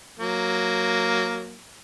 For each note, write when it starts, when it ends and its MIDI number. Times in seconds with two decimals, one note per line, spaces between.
0.20 1.57 54
0.20 1.57 58